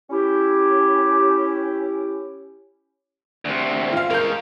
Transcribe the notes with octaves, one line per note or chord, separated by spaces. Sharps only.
C#4 E4 G4
D2 C3
F4 F5
G#3 A#4 F5 G6